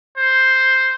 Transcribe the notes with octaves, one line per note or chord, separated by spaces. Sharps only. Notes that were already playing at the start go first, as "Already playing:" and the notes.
C5